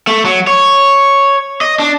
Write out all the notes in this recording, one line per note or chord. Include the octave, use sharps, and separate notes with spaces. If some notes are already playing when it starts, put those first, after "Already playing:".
A3
F#3
C#5
D#5
D4